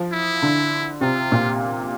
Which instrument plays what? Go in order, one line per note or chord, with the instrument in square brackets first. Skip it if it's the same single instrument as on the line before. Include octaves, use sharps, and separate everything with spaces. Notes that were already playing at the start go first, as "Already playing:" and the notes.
Already playing: [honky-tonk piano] F3
[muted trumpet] E4
[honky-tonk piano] D3
[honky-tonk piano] C3 [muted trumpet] F4
[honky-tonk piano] A#2